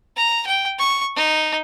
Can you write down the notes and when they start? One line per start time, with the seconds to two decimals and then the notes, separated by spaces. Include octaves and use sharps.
0.17 A#5
0.47 G5
0.79 C#6
1.16 D#4